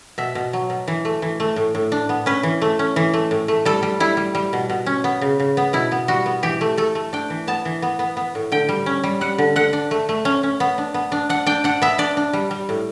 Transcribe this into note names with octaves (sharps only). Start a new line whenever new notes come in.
B2 E5
B2
F#3
B2
E3
A3
E3
A3
A2
A2
D4
B3
C#4 B4
E3
A3
C#4
E3
A3
A2
A3
G3 A4
G3
G3 E4
G3
G3
B2
B2
C#4
B3
C#3
C#3
B3
B2 E4
B3
G3 F#4
B3
E3 G4
A3
A3 A4
A3
D4 G5
E3
B3 A5
E3
B3
B3
B3
A2
D3 G5
G3
C#4
G3
G3 F#5
D3
D3 F#5
D4
A3
A3
C#4
C#4
B3
D4
B3
D4
D4 F#5
D4 G5
D4 F#5
B3 E5
D4 D5
D4
G3
G3
A2